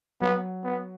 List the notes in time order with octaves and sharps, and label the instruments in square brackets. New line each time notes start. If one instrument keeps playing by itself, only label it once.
[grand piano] F#3 [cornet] B3
[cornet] B3